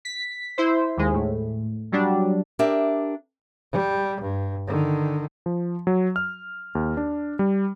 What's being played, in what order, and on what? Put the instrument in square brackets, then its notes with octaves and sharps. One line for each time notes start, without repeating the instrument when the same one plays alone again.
[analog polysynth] B6
E4 C5
D#2 G#3
A2
F#3 G3 D4
[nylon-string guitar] D4 G4 A#4 E5
[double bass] G3
G2
D3 D#3
[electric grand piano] F3
F#3
F6
D#2
D4
G3